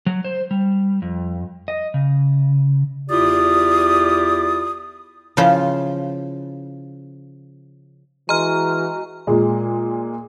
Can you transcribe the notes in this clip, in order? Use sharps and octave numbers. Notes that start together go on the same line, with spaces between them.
F#3
C5
G3
F2
D#5
C#3
E2 E4 F4 G4 D5 D#6
C#3 F3 E4 F4 C5
E3 G#3 F#4 A#5 F6
A#2 G#3